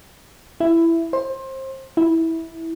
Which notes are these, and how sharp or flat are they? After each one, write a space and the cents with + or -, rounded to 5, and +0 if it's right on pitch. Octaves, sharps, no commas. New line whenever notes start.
E4 +10
C5 +25
E4 -15